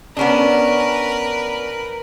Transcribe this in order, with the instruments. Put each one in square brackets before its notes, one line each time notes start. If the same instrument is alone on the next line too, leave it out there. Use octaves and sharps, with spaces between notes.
[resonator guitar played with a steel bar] B3 C#4 D4 [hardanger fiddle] A#4 B4